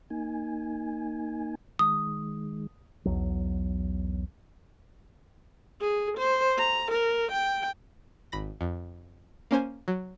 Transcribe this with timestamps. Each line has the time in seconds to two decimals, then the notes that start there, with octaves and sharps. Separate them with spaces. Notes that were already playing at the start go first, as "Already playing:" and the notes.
0.10 A#3 D#4 G#5
1.79 D#3 G#3 D#6
3.05 B1 E2 F#3
5.81 G#4
6.18 C5
6.58 A#5
6.91 A#4
7.32 G5
8.32 G#1 B5 A#6
8.61 F2
9.51 A#3 C#4 C5 G#5
9.88 F#3